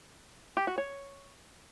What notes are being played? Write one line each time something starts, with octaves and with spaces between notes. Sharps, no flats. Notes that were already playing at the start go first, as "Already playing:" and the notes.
G4
F#4
C#5